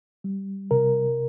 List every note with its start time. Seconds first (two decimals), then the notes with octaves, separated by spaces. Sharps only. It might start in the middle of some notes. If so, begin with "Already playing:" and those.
0.24 G3
0.71 C3 A#4